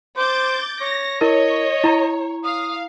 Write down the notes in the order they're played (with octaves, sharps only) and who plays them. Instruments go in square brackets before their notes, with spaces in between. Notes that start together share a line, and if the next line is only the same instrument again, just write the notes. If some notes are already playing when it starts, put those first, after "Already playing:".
[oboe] C5 [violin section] D6 G6 A6
[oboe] C#5 [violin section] A#6
[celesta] E4 A#4 [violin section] C#5 [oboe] D#5
[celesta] E4 A#5
[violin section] F5 [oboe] D#6